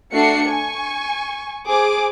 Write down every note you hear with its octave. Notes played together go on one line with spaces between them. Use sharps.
A3 D4 F#4 C7 C#7
G#5 C#6
G#4 C5 D6